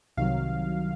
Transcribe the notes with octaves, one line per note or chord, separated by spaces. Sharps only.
C2 C3 D#3 F#3 F5